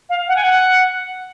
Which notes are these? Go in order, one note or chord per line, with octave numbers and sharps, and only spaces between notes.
F5
F#5
G#5
F#5